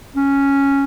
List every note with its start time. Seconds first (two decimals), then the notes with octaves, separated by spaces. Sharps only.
0.16 C#4